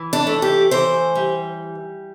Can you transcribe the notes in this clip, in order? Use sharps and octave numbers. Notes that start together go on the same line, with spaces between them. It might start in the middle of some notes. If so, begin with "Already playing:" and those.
Already playing: E3
D4
A3
G4
E3 C5
G3